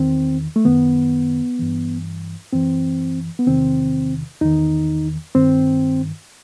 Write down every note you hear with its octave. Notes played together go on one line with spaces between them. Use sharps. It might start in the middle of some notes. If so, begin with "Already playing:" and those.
Already playing: E2 D#3 C4
A3
F#2 D#3 B3
G2 E3
F#2 E3 C4
B3
E2 C3 D#3 C4
E2 D#3 D#4
G2 D#3 C4